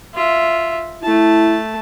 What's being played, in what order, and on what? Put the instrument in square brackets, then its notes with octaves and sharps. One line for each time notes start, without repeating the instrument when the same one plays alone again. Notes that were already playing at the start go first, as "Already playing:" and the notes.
[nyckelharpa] F4 E5
[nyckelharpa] A3 A5 [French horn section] E4